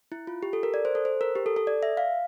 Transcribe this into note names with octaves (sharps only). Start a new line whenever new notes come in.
E4
F4
G4
A4
A#4
D5
C5
A4
C5
A#4
G4
A4
A4
D5
E5
F5